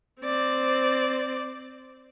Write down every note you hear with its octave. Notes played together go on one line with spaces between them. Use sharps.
C4 D5